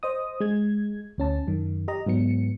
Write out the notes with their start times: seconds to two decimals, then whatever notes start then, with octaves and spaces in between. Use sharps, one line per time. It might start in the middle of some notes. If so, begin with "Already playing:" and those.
0.03 C5 D#5 D#6
0.40 G#3 G#6
1.18 D2 C#4 A5
1.47 F#2 D#3
1.88 G4 D#5 A#5
2.06 G#2 F#3 B3 C#7